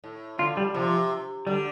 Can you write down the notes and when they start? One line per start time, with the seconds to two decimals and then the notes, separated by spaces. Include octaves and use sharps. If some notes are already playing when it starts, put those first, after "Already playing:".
0.04 A2
0.38 D3 F4
0.57 G3
0.74 C3 F3
1.47 D3 G3